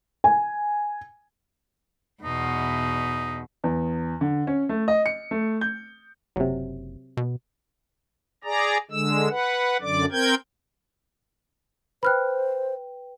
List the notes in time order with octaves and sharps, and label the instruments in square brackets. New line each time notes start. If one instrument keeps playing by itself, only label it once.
[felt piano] G#5
[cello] E2 B2 [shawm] D#4
[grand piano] E2
D3
C#4
A3
D#5
C#7
A3
G6
[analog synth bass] F#1 [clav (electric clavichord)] C3 F#3
[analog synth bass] B2
[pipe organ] G#4 D5 A#5
D3 G#3 E6
B4 F#5
F#2 D3 D5 D6
C4 A#4 G5 G6 G#6
[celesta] B4 G5 [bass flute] C5 [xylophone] B5 F6 F#6